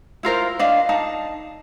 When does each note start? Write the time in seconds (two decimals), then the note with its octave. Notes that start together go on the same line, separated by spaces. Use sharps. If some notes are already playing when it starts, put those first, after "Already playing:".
0.23 E4 F4 A#4 C5
0.59 D4 D#5 F5
0.89 D#4 A5